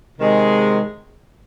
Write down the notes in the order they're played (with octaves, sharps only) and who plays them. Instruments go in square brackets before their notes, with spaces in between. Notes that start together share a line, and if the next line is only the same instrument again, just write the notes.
[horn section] C3 D#3 G#3